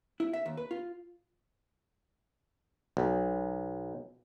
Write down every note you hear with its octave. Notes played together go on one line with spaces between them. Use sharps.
E4
E5
D#2
B4
F4
B1